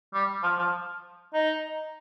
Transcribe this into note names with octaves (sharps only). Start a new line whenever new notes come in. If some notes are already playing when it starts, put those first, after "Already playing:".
G3
F3
F3
D#4